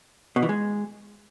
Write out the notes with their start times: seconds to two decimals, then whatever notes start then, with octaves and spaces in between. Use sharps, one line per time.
0.36 B2
0.43 E3
0.49 G#3